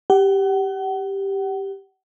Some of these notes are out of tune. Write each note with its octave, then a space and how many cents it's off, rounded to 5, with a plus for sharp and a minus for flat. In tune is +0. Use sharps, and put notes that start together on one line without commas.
G4 +0 F#5 +35